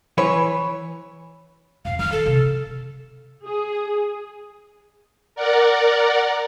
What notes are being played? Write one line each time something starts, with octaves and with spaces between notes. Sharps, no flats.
E3 B4 C#5
F2 A#2 F5
D3 D#3 F6
A4
C3
G#4
A#4 D5 F#5